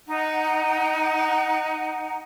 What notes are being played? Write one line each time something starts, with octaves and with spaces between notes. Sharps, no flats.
D#4 F#5